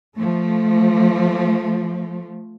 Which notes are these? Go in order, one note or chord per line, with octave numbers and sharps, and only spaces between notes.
F3 A3